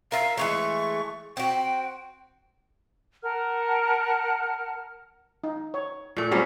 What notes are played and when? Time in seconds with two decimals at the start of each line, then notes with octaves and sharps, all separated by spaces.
0.12 A#4 E5 F5
0.37 E3 G#3 A3 C#6
1.37 C4 F#4 G5
3.23 A#4 F#5 A5 F6
5.44 D#4
5.74 C#5
6.16 A#2 A3
6.31 F#3 G3 C4 C#4 G#4